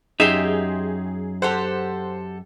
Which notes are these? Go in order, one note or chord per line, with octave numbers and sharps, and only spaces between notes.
F#2 D#4 G4 G#4 E5 G5 C6
G4 A4 C5 F#5